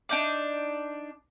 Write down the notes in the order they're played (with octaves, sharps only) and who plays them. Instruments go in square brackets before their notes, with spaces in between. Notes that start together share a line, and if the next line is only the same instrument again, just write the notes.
[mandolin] D4 D#4 D5